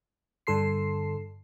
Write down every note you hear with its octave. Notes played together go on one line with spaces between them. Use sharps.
G2 D3 A4 C6 C7